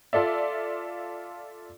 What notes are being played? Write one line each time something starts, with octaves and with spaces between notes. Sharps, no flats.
F4 A4 D5 E5